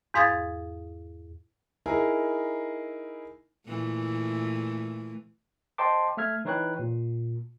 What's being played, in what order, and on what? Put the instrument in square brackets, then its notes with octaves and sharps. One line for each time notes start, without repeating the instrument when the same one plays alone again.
[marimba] E2 G#2 F5 D#6 G#6 A6
[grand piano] D#4 E4 G#4 A#4
[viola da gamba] A#2 E3 A3
[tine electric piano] C5 D#5 G5 A5 C6 D6
A3 E5 F6 G#6
E3 D#4 B4 C#5 G5 F#6
A#2